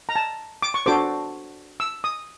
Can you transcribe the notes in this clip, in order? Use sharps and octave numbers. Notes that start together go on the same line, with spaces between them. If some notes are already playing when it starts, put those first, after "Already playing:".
A#5
A5
D6
C#6
D4 F#4 A4 C5 D6
E6
D#6